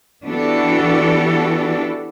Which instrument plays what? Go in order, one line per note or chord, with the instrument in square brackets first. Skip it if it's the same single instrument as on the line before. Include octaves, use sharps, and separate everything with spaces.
[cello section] E3 B3 D4 F#4 G4 A4